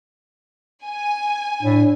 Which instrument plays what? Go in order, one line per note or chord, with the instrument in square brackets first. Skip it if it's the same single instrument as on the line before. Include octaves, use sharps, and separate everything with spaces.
[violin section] G#5
[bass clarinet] A2 [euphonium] D4